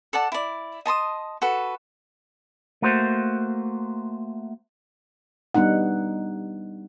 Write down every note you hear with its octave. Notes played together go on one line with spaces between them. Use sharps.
A4 D5 F#5 A5
E4 D5
D#5 A5 C6 D#6
F#4 A4 B4
A3 A#3 F#4 C5
G3 B3 D4 D#4 F#5